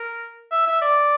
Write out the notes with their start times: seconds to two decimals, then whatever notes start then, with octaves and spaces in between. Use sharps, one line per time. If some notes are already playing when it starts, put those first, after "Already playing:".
Already playing: A#4
0.52 E5
0.67 E5
0.82 D5